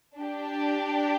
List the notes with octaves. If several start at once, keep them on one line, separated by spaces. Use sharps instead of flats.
D4 G4